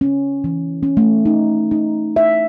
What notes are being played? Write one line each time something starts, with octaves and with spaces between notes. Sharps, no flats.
C#4
E3
C#4
A3
D#4
D#4
E5